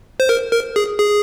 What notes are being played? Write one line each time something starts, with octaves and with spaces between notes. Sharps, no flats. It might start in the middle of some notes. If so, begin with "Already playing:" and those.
C5
A#4
A#4
G#4
G#4